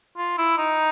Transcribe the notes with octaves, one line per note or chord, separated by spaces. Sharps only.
F4
E4
D#4